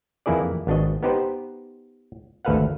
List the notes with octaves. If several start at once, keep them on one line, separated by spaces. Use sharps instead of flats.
F2 E3 A#3 E4 G#4 D5
G#1 B3 D4 F#4 D#5
B3 D#4 G4 B4 C5
G#1 D2 A4 B4 F5 F#5